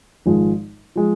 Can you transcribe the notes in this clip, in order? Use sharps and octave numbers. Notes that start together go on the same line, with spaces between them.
G#1 G#2 F3 G#3
F3 G#3